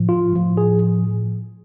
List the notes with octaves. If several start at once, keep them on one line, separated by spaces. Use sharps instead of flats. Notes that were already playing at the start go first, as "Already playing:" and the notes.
Already playing: A2 F3
F4
A2 F3
G#4